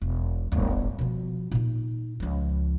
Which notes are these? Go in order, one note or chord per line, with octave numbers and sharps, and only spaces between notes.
E1
D1 G1
B2 F3
A#2 D#4
C#2 F3